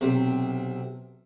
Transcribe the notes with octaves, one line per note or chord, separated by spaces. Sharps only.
B1 C3